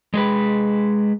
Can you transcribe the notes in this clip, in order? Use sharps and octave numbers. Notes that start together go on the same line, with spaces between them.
G#3 G#4 B4